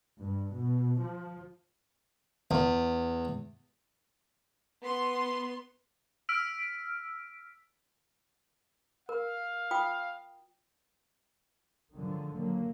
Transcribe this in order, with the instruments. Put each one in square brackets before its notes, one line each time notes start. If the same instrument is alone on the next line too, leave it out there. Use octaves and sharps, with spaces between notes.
[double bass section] G2
B2
F3
[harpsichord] E2
[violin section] B3 C6
[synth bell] E6 F6 B6 D7
[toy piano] A#4 [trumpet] F5
[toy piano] F4 G5 D#6
[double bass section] G#2 D3 D#3 F3 F#3
F#3 A#3